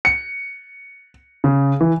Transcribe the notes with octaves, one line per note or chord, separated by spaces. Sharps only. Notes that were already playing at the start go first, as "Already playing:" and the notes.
C#7
C#3
E3